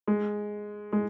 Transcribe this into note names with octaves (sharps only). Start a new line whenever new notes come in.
G#3
G#3